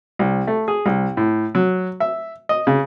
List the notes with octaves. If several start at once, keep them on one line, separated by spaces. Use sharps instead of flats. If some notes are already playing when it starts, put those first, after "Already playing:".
C2
A3
G#4
C2
A2
F#3
E5
D#5
C#3